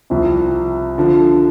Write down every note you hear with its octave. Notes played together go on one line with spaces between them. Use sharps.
C2 C3 F3
D3 F3